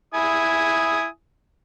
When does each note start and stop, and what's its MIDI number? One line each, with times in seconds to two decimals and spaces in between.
0.14 1.05 64
0.14 1.05 80
0.14 1.05 87